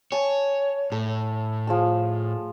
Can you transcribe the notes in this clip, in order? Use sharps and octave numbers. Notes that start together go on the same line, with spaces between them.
C#5 G#5 A5
A2 A4
F3 G#4 A5